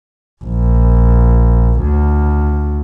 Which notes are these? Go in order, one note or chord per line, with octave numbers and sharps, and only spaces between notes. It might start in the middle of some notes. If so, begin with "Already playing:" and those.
A#1
D2